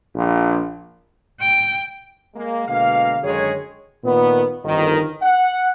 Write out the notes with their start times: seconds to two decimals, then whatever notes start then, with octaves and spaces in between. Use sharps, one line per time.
0.15 A#1
1.40 G5
2.35 G#3 A#3
2.68 B2 D3 G#3 A#3 F5
3.23 F#2 D3 D#3 G#3 G#4 C#5
4.04 A#2 D#3 B3
4.63 G1 F2 D#3
5.22 F#5